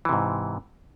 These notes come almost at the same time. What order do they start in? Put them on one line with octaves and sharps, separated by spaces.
E3 C3 G#2